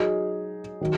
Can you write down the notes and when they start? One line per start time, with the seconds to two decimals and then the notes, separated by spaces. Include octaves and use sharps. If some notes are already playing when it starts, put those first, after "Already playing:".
Already playing: F#3 D#4 G#4
0.81 D#3 F#3